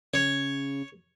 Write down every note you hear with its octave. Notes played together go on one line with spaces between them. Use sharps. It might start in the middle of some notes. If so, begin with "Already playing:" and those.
C#3 C#5